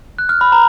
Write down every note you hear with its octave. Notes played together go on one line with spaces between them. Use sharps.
F#6
F6
B5
A#5